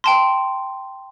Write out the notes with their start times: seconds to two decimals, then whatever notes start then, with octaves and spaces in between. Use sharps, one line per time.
0.04 G5 A5 C6